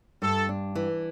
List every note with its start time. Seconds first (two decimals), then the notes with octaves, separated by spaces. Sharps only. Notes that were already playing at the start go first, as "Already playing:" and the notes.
0.22 G2 A4
0.49 D4
0.75 E3